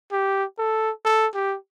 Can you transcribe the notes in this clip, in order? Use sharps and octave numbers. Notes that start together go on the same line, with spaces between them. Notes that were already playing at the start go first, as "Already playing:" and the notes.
G4
A4
A4
G4